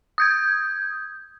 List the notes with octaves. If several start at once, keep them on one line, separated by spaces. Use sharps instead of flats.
D#6 G6 G#6